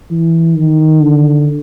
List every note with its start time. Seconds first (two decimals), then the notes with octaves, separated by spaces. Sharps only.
0.11 E3
0.56 D#3
1.01 D3